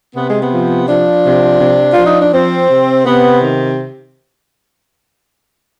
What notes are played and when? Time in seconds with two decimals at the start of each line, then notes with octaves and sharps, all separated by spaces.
0.15 C3 B3
0.28 G#3
0.43 B3
0.51 F3
0.88 F3 D4
1.25 C3
1.60 C3
1.93 F3 F4
2.06 D#4
2.20 D4
2.33 F3 C4
2.68 C3
3.05 C3 B3
3.41 D#3